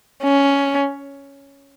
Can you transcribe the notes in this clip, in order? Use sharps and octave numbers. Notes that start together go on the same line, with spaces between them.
C#4